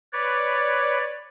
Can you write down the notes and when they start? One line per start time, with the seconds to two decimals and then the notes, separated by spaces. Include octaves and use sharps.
0.13 B4 C#5 D5